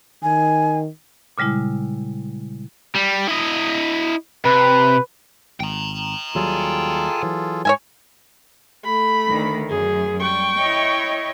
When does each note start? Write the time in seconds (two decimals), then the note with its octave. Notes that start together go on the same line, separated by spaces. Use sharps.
0.23 D#3 G#5
1.38 A#2 C#3 G3 G#3 E4
2.95 G3
3.29 E4 D#5
4.45 C3 B4
5.60 G#1 G5 A#5
6.35 D#2 F#3 G3 F4 G#4 A4
7.23 E3 F#3
7.65 G#2 C#5 E5 G#5
8.84 A3 B5
9.29 D2 D#3
9.69 F#2 G#4
10.21 G3 G5 C#6
10.58 E4 C#5 D#5